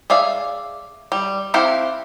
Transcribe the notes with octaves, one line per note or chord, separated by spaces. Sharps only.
G#4 D5 E5 F5
G3
C4 E4 G4 F5 F#5